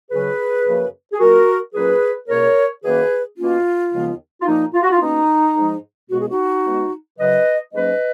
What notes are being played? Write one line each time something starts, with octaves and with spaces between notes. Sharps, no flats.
C#2 C#3 F#3 C#4 G#4 B4
F#2 C#3 F3 A#3
G#4
A#2 F#3 A#3 F#4 A#4
A#2 F#3 C#4 G#4 B4
C#2 B2 A#3 A#4 C#5
F#2 D#3 A#3 C#4 G#4 B4
B2 A#3 C#4 F4
D#2 C#3 F3 G#3 B3
F4
A#2 F3 A#3 D#4
F4
F#4
F4
B2 A#3 C#4 D#4
G#2 F3 G#3
C#2 B2 G#3 B3 F#4
G#4
D#4 F#4
B2 G#3 B3
F#2 C#3 F#3 B4 D#5
G#2 F#3 A#3 C#4 B4 D#5